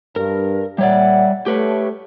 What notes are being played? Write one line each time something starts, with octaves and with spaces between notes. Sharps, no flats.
G2 A#4
A#2 G3 C#5 D5 E5 F#5
A3 G4 B4 C#5